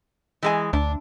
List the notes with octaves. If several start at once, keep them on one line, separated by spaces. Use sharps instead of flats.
E3 G#3 G#5
D2 D4